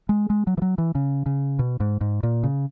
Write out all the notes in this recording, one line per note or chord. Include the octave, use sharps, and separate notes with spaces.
G#3
G#3
F#3
E3
F#3
E3
C#3
C#3
B2
G#2
G#2
A#2
C#3